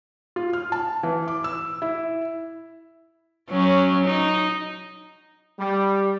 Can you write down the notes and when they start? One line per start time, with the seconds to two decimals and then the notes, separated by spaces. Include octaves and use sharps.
0.36 F4
0.53 F6
0.72 A5
1.03 E3
1.28 D6
1.44 E6
1.82 E4
3.50 F#3 C#4
4.05 D#4
5.60 G3